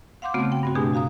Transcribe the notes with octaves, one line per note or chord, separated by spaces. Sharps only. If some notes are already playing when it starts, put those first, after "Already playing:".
F5 F#5 C6 D6 G6
C#3 A3 B3 C4 F#4
G5
G2 C4 F#4
B2 A3 D4 G4 G#4 G#5
D2 F#4 F5 A#5 D#6